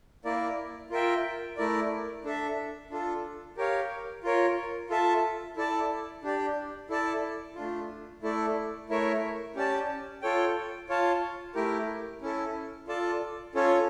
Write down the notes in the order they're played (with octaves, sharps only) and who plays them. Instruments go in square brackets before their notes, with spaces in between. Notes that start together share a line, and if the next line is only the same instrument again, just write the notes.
[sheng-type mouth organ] A#3 E4 A#4 D5
F4 A#4 E5 G5
A3 E4 A#4 D5
D4 A4 E5
D4 F4 A4
G4 A#4 C#5 F5
F4 A#4 C#5
F4 A4 E5 A5
E4 A4 D5 A5
D4 G4 D5
E4 A4 D5 A5
A3 D4 F4
A3 E4 A4 D5
A3 E4 A#4 C#5 E5
C#4 G4 D5 A5
F4 A4 C#5 G5
F4 C#5 F5 A5
A3 E4 G4 A#4
C#4 E4 A4
F4 A4 D5 A5
C#4 F4 A4 C#5